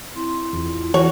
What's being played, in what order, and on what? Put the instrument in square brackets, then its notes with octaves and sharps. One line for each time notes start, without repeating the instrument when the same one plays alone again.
[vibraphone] C4 E4 C6
[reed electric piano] E2 [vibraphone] E4 F4
[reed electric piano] E3 F#4 [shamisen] C#5